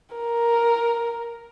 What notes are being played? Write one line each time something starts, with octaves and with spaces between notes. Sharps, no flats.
A#4